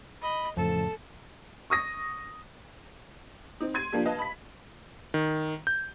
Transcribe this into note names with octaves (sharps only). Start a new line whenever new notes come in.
D#5 B5
F2 A2 C#3 F3 A4 A5
C#6 D#6 A#6
C4 D#4
C6 G#6 D#7
F3 A#3 D4 G4
B4 D#5 F5 A5
B5 B6
D#3
G6